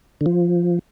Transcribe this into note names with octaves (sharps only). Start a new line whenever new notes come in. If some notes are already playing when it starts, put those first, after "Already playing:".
D3
F3